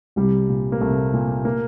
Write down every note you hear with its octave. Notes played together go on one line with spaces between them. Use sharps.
C2 G3
A#2
A#3
C2 A3
A#2
A#3